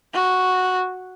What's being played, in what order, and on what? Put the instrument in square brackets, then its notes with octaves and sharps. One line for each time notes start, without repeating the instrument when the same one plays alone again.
[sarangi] F#4